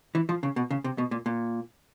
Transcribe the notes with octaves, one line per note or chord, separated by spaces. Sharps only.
E3
F3
C#3
B2
C#3
C3
B2
A#2
A#2